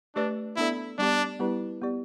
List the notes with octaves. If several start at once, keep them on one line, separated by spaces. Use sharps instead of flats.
A3 D4 G4 B4 D5
B3 D4 E4 A4 D5
G3 B3 D4 G4
G3 B3 E4 G4 B4
B3 G4 D5